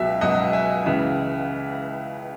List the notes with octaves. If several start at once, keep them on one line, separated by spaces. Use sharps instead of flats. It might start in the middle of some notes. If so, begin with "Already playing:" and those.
Already playing: C#2 B2 F#3 E5
C#2 B2 F#3 D#5 F#5
E5 G#5
C#2 C#3 E3 E5